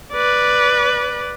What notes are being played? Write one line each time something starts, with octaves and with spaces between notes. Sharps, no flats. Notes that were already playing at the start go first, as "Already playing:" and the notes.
B4 D5